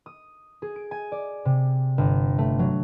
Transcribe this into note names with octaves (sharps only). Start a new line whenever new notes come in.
D#6
G#4
D7
G#5
D5
C3
G1
A3
F#3